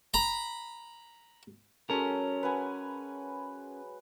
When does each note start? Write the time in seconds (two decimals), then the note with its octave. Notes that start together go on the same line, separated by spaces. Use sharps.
0.14 A#5 B5
1.90 F#3 G#3 C#4 A4 A#4
2.43 B4 F#5 G#5